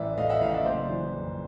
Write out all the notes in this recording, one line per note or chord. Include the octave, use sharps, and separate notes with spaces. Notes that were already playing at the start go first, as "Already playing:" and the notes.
Already playing: A1 E3 D5 E5
A2 D#5 F5
E5 F#5
A1 D#5 F5
D5 E5
F#1 C5 D5
E3
F2